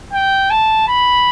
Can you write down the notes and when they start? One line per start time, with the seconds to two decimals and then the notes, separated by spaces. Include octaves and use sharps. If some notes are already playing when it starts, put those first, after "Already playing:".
0.13 G5
0.50 A5
0.88 B5